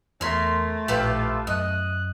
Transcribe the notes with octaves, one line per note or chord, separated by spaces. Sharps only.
E2 A3 A#4 C6 G#6 B6
A#1 A2 F4 G4 A4 B4
F#2 D#5 F#6